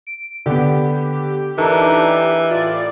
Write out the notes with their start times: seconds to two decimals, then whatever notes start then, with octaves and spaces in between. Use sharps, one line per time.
0.07 D7
0.46 D3 B3 G4
1.58 E3 D4 D#4 A4 A#4
2.51 A2 F4 D5